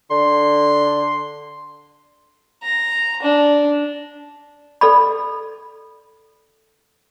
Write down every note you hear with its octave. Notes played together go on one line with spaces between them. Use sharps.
D3 C6
A#5
D4
A4 D5 B5